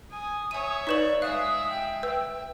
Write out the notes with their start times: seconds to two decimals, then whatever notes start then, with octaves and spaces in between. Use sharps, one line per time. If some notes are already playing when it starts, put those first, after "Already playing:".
0.11 G#5 D#6
0.51 C#5 E5 G#5 D#7
0.87 D#4 B4 D5 C#6 E7 F#7
1.22 G#3 E5 F5 D#6 F#6
1.69 G5
2.03 B4 E5 E6